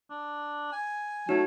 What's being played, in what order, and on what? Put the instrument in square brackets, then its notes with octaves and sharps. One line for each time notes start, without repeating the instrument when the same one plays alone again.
[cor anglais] D4
G#5
[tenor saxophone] F#3 [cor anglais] A3 [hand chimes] D#4